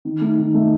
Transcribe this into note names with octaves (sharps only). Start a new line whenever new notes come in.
D#3
A3 D#4
D#3
A3 D#4